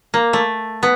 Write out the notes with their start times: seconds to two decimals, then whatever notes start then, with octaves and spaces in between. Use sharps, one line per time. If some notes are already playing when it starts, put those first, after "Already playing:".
0.14 A#3
0.33 A3
0.83 B3